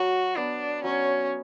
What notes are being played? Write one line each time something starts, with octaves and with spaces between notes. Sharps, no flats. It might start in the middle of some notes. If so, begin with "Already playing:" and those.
Already playing: F#3 F#4
B3 D4
F#3 C#4